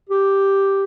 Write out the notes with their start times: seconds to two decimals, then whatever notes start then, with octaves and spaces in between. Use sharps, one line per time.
0.10 G4